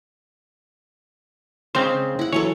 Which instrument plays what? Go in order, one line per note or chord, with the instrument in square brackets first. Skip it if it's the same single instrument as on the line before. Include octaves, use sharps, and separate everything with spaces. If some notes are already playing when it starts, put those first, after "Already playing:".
[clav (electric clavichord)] C#3 C4 C5 [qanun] G#3 F5
[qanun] E4 F#5
[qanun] E3 F#3 A4 [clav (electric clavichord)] C#5